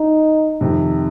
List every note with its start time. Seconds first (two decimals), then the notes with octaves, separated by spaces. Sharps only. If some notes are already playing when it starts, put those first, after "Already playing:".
Already playing: D#4
0.61 F2 C3 D#3